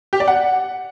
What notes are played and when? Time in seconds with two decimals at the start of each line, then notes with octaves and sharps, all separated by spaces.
0.13 G4
0.20 D5
0.28 F#5